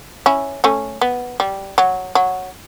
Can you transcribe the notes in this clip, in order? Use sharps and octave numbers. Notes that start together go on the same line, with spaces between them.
C#4 E4
A3 C#4
B3
G3
F#3
F#3